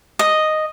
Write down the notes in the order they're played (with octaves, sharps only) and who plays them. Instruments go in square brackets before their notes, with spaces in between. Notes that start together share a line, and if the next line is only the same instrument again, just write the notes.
[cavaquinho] D#5